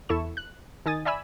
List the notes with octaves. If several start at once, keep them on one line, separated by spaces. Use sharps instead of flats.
E2 E4 A4 C#6 E7
F#6
D#3 D#4 G#5 D#6 A6
D5 E5 G#5 B5 E6